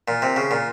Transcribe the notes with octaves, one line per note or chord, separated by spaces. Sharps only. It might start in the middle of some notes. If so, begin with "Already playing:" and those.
A#2
C3
C#3
A#2